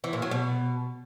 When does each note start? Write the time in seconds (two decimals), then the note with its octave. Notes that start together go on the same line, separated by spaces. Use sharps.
0.04 E3
0.13 A#2
0.22 F#3
0.31 B2